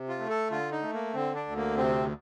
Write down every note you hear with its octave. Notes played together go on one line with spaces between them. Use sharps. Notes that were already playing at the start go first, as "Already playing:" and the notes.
Already playing: C3
F4
A3
A4
D3 F4
D#4
A3
A#3
D3 C4
D4
D2
A#3
C3 C4